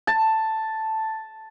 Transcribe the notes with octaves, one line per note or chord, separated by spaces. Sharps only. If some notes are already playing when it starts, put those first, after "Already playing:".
A5